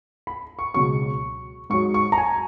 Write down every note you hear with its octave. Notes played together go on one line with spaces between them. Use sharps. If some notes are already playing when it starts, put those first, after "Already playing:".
B5
C#6
C#2 B2 F#3 C#6
G#2 F#3 C#6
C#6
A#5
G#5